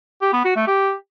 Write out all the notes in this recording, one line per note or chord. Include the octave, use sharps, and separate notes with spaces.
G4
B3
F#4
A3
G4